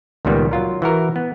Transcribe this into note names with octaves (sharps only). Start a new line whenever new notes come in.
C#2 A#2 D#3 G3 B3
F#3 F4 A#4
E3 F#4 A#4
B3